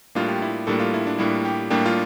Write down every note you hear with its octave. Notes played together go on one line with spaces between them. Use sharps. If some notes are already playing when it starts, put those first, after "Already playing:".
A2 G3 A#3 D4 F4
G4
E4
A2 G3 A#3 D4 A4
F4
E4
D4
A2 G3 A#3 D4 E4
G4
A2 G3 A#3 D4 G4
F4